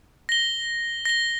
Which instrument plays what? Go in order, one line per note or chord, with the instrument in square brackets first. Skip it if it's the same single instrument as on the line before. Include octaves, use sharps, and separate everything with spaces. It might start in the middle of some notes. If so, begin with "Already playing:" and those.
[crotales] A#6 G7
A#6 G7